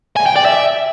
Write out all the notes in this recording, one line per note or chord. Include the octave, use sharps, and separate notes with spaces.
G#5
G5
D5
E5